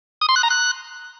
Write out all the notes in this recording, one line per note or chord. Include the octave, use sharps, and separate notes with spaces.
D#6
C6
F#6
A#5
F#6